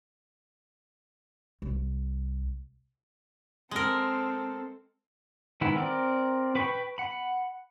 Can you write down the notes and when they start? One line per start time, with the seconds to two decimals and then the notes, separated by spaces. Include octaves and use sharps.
1.62 C2
3.71 G#3 C4 A4 A#4
5.61 D#3 G#3 E4 B4 F#5
5.76 C4 A#4 D5
6.55 B4 G5 B5 C#6
6.98 F#5 B5